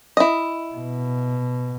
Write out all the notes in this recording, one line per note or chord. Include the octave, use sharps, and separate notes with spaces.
E4 D#5
B2